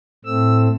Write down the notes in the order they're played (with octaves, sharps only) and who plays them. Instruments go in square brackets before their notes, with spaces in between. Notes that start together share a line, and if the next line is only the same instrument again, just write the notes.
[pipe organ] A2 A3 C4 E6